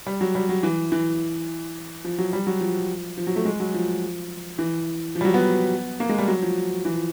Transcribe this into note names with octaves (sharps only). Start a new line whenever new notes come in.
G3
F#3
G3
F#3
E3
E3
F3
F#3
G3
F#3
F3
F3
F#3
A3
G#3
F#3
F3
E3
F3
G3
F#3
B3
A#3
G#3
G3
F#3
F3
E3
F3